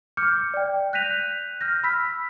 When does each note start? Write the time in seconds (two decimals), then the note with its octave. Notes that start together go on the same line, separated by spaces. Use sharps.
0.17 D6 F6 G6 C#7
0.54 D5 G5
0.93 F#6 G6 A#6 B6 D#7 F7
1.61 F6 G6 A#6
1.84 B5 E6 F6 B6